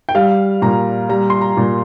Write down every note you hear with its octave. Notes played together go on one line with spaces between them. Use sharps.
G5
G3 F5
A#2 A#5
G3 A#5
C6
A#5
A#2